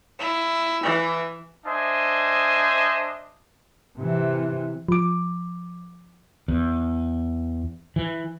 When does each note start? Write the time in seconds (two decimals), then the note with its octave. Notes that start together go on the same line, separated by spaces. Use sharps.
0.19 E4
0.83 E3
1.66 D4 C5 D#5 E5 G#5
3.99 C3 E3
4.89 F3 D6
6.48 E2
7.96 E3